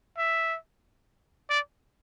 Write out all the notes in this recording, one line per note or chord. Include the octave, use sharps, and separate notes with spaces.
E5
D5